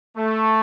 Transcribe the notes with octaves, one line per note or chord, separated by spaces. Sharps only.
A3